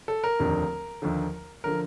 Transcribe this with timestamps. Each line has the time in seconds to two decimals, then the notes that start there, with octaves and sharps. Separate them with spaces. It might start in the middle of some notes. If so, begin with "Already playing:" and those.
0.08 A4
0.24 A#4
0.39 F1 D#2 D3 F3
1.02 D#2 D3 F3
1.64 D3 F3 A#4